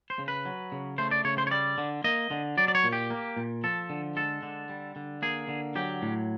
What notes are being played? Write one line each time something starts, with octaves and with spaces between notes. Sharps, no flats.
C5
C#3
B4
F#3
C#3
A3 C5
D5
C#3 C#5
C5
C#5
G3 D5
D3
A#3 D#5
D3
F#3 D5
D5
C#5
A#2
G4
A#3
A#2
F3 A4
D3
G#3 A4
D3
G3
D3
A#3 G#4
D3
F#3 G4
A2